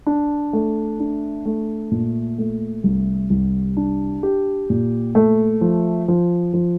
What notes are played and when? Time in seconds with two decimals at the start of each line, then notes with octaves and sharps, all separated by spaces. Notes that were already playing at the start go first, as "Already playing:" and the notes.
0.06 D4
0.53 A3
1.00 D4
1.46 A3
1.91 A#2
2.38 A3
2.84 C2
3.30 C2
3.77 D4
4.23 G4
4.70 A#2
5.15 A3
5.61 F3
6.08 F3
6.54 F3